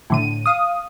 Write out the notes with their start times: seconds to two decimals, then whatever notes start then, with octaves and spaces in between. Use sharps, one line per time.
0.10 A2 D3 D#7
0.46 F5 D#6